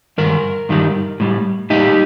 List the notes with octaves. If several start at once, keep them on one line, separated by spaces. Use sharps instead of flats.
G2 D#3 A#4
G2 D#3 G3
A2 G3
A2 G3 D#4 G4